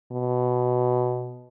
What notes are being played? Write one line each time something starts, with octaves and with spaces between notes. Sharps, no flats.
B2